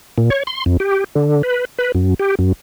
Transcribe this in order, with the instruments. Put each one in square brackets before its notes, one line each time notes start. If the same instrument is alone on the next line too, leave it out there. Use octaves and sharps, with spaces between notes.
[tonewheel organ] A#2
C#5
C6
F2
G4
D3
B4
B4
F#2
G4
F#2